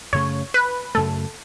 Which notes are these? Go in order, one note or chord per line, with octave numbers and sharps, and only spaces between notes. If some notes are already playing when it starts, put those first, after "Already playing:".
F#2 C#3 A3 C#5
B4
F#2 C#3 A3 A4